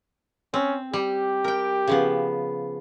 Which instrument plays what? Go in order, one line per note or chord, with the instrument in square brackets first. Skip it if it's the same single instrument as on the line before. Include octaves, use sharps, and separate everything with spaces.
[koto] C4 [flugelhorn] C#4
[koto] G3 [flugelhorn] G4
[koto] A#4 G5
C#3 F3 B3